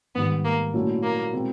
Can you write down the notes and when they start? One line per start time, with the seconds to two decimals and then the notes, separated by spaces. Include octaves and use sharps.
0.15 G#2 D#3 G3 B3
0.45 A#3
0.74 A#2 F#3 A3 C#4 E4
1.03 A#3
1.33 B2 G#3 C4 E4